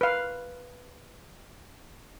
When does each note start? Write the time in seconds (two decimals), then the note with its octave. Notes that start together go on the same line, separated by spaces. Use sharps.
0.01 B4 F5